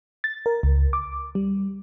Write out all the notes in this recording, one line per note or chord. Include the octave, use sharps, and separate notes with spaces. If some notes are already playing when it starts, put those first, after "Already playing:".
A6
A#4
C#2
D6
G3